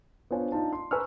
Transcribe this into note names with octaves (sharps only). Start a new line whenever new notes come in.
B3 D4 F4 C5 C#5 G#5
D4 D#4 F4 A5
C6
B4 G#5 A#5 C#6 E6 F6